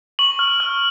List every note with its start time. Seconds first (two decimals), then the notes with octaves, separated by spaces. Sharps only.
0.19 C#6 F#7
0.39 F6
0.60 F6